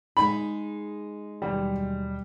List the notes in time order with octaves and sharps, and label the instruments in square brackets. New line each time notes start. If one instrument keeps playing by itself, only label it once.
[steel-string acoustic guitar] G#3 D#4 G#4 [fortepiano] B5
[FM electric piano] D#2 B2 F#3 [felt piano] G3